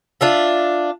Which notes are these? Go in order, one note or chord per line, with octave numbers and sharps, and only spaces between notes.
D4 F4 E5